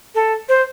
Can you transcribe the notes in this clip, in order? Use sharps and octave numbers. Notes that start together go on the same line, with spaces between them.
A4
C5